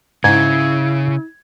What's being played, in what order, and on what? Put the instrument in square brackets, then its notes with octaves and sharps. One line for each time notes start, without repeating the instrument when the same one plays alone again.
[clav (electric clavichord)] G#2 [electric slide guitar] C#3 [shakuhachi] E4 [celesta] G#6